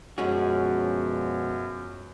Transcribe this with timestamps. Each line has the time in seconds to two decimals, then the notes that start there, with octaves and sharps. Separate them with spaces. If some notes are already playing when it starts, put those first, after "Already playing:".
0.18 F#2 B2 F3 G#3 C#4 F#4